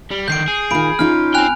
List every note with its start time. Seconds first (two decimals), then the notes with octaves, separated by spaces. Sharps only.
0.11 G3
0.28 D3 D#3 G6 C7 D7
0.48 G#4
0.71 A#2 D#3 B5 D7
0.99 C#4 D#4 F4 F6
1.34 C4 G5 G#5 F#6 F7